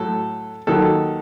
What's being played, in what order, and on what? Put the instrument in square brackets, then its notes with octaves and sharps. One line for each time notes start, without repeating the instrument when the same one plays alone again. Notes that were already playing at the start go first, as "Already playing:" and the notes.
Already playing: [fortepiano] A2 F#3 A4
D#2 D#3 F#3 A4